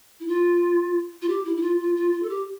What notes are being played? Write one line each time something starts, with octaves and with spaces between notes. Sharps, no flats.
E4
F4
F4
G4
E4
E4
F4
F4
F4
F4
A4
G4